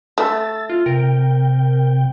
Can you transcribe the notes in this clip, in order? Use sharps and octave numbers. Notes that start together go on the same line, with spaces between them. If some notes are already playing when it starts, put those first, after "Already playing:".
A3 E6 A6
F4
C3 A#4 G5